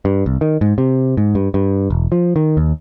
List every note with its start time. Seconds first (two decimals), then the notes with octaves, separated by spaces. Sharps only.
0.05 G2
0.26 C2
0.41 D#3
0.61 G#2
0.78 C3
1.17 G#2
1.35 G2
1.54 G2
1.90 E1
2.12 F3
2.36 D#3
2.57 D#2